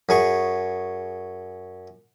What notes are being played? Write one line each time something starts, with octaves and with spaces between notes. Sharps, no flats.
F#2 G#4 C#6